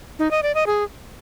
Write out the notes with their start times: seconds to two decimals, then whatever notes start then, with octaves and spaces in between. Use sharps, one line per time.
0.19 D#4
0.31 D#5
0.43 D5
0.55 D#5
0.67 G#4